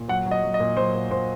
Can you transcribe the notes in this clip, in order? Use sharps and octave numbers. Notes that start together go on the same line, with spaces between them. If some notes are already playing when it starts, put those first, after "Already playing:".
Already playing: A#2
F#3 F#5
F#3
D#5
F#3
D#5
A#2
F#3 C5
A#2
A#2 C5